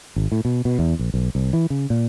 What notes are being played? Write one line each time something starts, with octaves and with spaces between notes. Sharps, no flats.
G#1
A2
B2
B2
E2
A#1
B1
C2
E3
C#3
A#2